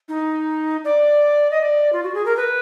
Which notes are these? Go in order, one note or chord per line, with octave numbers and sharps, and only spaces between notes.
D#4
D5
D#5
D5
F4
F#4
G#4
A#4
B4